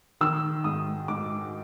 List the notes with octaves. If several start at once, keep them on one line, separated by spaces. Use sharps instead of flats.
D#3 E6
G#2 D#6
G#2 D6